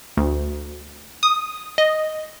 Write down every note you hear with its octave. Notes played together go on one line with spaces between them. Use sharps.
D2
D#6
D#5